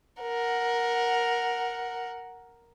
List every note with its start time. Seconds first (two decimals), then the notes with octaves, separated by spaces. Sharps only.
0.21 A#4 F#5